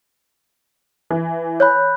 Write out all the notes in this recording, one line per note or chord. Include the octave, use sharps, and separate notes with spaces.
E3
C#5 B5 F#6 G6